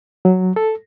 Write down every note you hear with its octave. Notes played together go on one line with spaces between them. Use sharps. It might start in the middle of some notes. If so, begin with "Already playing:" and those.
F#3
A4